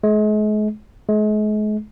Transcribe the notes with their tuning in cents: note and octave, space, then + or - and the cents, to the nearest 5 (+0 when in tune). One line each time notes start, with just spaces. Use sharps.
G#3 +40
G#3 +40